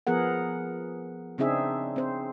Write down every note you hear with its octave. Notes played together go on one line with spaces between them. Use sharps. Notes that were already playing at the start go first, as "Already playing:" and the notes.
F3 B3 G#4 A#4 F#5
C#3 C4 D4 D#4 G#4 E5
C4 C5